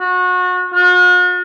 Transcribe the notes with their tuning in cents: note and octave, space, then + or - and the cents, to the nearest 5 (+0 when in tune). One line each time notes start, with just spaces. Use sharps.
F#4 -30
F#4 -45